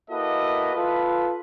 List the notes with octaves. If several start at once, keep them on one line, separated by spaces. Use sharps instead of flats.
A#3 E4 F#4 A4 B4 D#5
F4 A4 B4